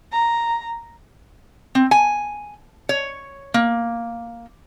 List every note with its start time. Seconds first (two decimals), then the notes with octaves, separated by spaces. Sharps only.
0.12 A#5
1.75 C4
1.91 G#5
2.89 C#5
3.54 A#3